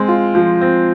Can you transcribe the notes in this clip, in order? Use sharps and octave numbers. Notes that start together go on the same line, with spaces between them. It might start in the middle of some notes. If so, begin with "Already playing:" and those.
Already playing: G#3 C4
F4
F3
C4